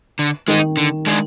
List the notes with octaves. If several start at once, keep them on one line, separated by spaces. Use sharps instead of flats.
D3
D#3 G#3 D#4
D3
G#3 D4 G#4